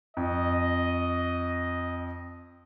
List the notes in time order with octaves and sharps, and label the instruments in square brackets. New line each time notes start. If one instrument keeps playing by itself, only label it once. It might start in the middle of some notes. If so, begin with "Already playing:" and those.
[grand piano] F2 [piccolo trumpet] D#5